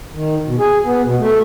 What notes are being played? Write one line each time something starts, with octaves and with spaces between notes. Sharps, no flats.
D#3
B2
G#4
B3
B2
A3